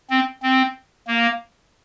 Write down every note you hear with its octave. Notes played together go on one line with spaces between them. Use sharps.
C4
C4
A#3